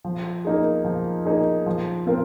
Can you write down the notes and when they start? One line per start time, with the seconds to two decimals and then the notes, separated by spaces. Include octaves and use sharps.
0.05 F3
0.45 A#3 D#4 G#4
0.85 F3
1.25 A#3 D#4 G#4
1.66 F3
2.06 C4 F4 A#4